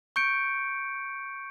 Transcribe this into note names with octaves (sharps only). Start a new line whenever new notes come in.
C#6 G6 C#7 D7